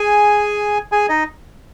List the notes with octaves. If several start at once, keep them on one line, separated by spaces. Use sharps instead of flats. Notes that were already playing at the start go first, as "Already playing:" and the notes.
Already playing: G#4 G#5
G#4 G#5
D#4 D#5